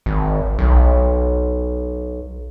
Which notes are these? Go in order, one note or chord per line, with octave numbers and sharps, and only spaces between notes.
G#1
B1